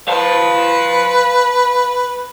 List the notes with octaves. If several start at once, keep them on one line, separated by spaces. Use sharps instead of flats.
B4 F5 A5